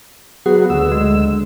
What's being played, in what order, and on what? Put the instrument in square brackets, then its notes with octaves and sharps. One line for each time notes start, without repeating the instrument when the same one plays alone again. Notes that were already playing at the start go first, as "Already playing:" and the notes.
[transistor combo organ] F#3 B3 F#4 [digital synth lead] G#4
[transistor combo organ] D2 E6
[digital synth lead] G#3